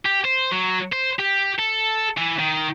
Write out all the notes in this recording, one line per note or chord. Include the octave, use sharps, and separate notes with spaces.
G4
C5
F#3
C5
G4
A4
E3
D#3